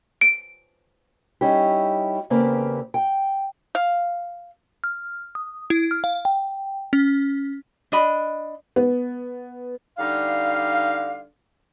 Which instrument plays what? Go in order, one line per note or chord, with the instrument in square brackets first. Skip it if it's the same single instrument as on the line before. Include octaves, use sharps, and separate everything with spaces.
[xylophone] D7
[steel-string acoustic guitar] G3 C#4 D#4 E4 G4
E2 C#3 A#3 C4 G4 B4
G5
[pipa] F5
[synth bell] F6
D#6
E4
F6
F5
G5
C#4
[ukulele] D4 D#5 B5
[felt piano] B3
[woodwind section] D3 G3 D#4 F5